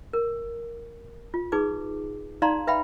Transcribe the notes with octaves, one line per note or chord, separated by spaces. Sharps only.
A#4
F4
D#4 G#4 B4 D6
D#4 D5 F5 A#5 C6
B4 E5 F5 G5 B5